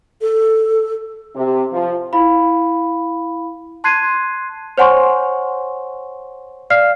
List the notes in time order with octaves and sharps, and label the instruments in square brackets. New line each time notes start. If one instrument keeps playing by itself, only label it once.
[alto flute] A4
[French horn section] C3
F3
[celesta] E4 F5 B5
A5 C6 F#6 G#6 C7 D#7
C5 C#5 F#5 G#5 C6 C#6
D5 F5 F6 C7